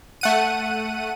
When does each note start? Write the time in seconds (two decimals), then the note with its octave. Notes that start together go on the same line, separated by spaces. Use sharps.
0.21 A3 F#5 D#7